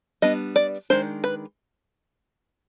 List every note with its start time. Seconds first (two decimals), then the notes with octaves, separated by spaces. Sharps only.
0.22 G3 B3 D4 D#5
0.56 D5
0.90 D#3 G#3 D4 C5
1.24 B4